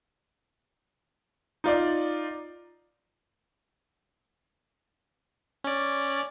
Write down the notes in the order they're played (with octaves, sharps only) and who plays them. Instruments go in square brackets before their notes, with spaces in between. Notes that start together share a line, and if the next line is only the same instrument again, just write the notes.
[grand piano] D#4 F4 D5
[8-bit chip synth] C#4 D5